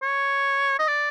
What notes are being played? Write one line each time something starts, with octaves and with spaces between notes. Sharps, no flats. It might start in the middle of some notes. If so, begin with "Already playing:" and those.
C#5
D#5
D5